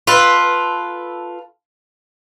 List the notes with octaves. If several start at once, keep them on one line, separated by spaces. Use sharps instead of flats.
F4 A4 B4